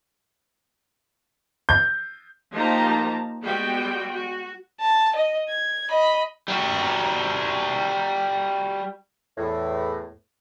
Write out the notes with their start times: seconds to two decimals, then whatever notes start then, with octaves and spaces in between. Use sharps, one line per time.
1.69 G6
2.53 F3 A#3 D#4 G4 A5 A#5
3.43 G3 G#3 B3 F#4 G4 G5
4.12 F#4
4.81 A5
5.16 D#5
5.49 G#6
5.90 D#5 B5
6.48 G3 F#4
9.38 E2 A2